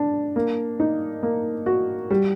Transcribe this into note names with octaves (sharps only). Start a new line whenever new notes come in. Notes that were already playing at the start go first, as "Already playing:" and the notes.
Already playing: D4
A#3
D#4
A#3
F#4
G3